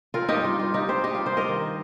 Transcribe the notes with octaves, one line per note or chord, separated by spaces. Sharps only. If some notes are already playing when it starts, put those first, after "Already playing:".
C4 F4 A#4
D#4 G4
G2
F4
G3 F4
D#4 G4
G2
G4 C5
G3 D#4 G4
F4
G2 G4 C5
A#4 D#5
D#3